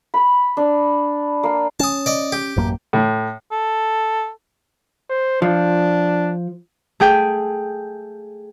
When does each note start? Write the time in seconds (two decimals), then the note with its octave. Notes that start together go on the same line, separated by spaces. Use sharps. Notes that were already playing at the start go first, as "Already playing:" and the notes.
0.14 B5
0.57 D4
1.43 A#3
1.80 C#4 A5 D#6
2.06 D5 D#5
2.32 G4
2.57 A1 F#2 A#3
2.93 A2
3.52 A4
5.10 C5
5.42 F3 D4
7.00 A3 G#4 G5